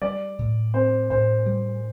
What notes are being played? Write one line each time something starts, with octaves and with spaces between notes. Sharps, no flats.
G3 D5
A2
C4 C5
A2 C5
G3